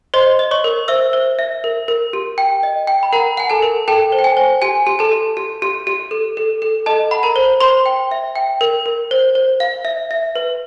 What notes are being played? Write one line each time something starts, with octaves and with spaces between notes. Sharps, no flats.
C5 D#5 C6
D#5
C#5 C#6
A#4
C5 E5 E6
C5
E5
A#4
A#4
G4
G5
D#5
G5
B5
A#4 F#5 A#5
F#5 G#5
A4 A5
A#4
A4 G5 A5
C5
G5
G#5
C5
G4 G#5
G4
A4 A5
G4
G4
G4
G4
A4
A4
A4
A4 D#5 A5
F#5 B5
A#4 A#5
C5
C5 C6
G5
E5
G5
A#4
A#4
C5
C5
F5
E5
E5
B4